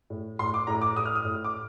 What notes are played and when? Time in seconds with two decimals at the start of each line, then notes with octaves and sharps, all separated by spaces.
0.10 A2
0.39 A2 C6
0.54 D6
0.67 A2 A#5
0.82 D6
0.96 A2 D#6
1.06 F6
1.15 D#6
1.25 A2
1.44 D6